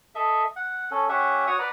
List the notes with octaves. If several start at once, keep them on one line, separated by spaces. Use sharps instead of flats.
A4 D#5 E5
F#5
C#4 A4
C#4 G4 E5 F#5
F#4 C#5 C#6 D#6
B4 D5 F#5 A#5